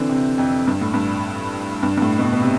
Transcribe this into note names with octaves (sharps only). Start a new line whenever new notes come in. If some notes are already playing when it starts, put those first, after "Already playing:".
Already playing: D3 E3 C4
C3
F2
G2
A2
G2
G2
G2
A2
B2
A2
B2
C3